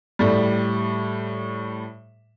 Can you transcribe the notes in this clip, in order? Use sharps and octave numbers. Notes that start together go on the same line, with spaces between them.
A2 G3